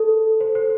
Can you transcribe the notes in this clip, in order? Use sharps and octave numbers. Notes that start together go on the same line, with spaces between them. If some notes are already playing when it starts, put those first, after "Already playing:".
Already playing: A4
C5
C5